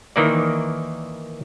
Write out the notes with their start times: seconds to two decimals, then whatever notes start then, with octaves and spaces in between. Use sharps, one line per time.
0.16 D#3 E3 A#3 D5